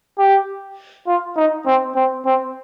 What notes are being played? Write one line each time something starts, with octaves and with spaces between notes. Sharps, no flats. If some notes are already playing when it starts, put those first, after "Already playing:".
G4
F4
D#4
C4
C4
C4